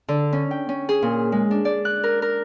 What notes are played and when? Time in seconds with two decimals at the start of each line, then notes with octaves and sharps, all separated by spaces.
0.08 D3
0.33 C#4
0.51 G5
0.69 C#4
0.89 G#4
1.02 A#2
1.32 G#3
1.51 D4
1.65 D5
1.85 F#6
2.03 A#4
2.22 A#4